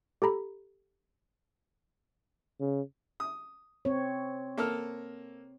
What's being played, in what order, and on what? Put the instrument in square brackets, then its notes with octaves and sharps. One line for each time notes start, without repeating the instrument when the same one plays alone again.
[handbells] G4 A4 A#5 B5
[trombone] C#3
[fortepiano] D#6
[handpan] C4 C#5
[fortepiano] A#3 A4 F6